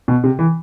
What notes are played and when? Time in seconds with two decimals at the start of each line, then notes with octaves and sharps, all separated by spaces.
0.08 B2
0.24 C3
0.39 E3